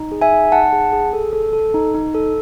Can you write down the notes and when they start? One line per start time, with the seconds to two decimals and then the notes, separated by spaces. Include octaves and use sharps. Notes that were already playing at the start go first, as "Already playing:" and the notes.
Already playing: D#4
0.12 G#4
0.21 E5 G#5
0.32 D#4
0.52 D#4 F#5 A5
0.73 G#4
0.92 G#4
1.13 A4
1.33 A4
1.53 A4
1.74 D#4
1.94 D#4
2.14 A4